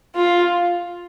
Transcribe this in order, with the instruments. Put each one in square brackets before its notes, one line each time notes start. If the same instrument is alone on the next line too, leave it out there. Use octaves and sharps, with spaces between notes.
[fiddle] F4